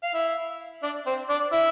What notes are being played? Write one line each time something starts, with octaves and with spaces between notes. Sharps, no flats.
F5
E4 E5
D4 D5
C4 C5
D4 D5
E4 E5